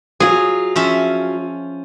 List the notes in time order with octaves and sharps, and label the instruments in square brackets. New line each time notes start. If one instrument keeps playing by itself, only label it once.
[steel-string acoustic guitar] F#3 F4 [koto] G#4
[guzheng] F3 C#4 E5